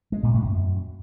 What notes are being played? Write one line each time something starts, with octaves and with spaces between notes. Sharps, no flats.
G#3
A#2
A2
F#2